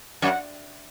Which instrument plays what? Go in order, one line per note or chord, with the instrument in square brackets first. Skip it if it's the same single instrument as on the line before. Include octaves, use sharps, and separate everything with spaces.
[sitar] F#2 [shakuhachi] F#5